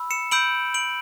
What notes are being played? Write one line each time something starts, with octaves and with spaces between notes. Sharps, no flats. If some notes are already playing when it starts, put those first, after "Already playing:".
Already playing: B5 E6
C#7 E7
B5 E6 G6 D7 F#7
D7 F#7